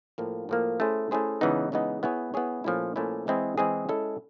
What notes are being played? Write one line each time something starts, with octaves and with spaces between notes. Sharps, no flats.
A2 F3 A#3
A2 F3 A#3
A3 C#4 E4 G#4 C5
A3 C#4 E4 G#4 C5
C#3 E3 G#3 B3 D#4
C#3 E3 G#3 B3 D#4
B3 E4 G#4 C#5
B3 E4 G#4 C#5
A#2 F3 A3 C#4 E4
A#2 F3 A3 C#4 E4
E3 G#3 C4 E4 G#4
E3 G#3 C4 E4 G#4
G#3 C#4 E4 A4